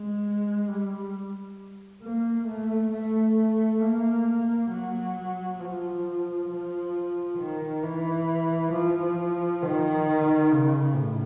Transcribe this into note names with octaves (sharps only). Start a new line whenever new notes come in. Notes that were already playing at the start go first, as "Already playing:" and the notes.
Already playing: G#3
G3
A#3
A3
A3
A#3
F#3
F3
F3
D#3
E3
F3
D#3
C#3
A2